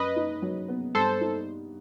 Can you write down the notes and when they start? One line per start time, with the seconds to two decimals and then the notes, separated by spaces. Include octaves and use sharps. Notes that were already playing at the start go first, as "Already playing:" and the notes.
Already playing: F#2 B4 D#5
0.16 D#4
0.42 F#3
0.68 B3
0.95 G2 A4 C5
1.21 D#4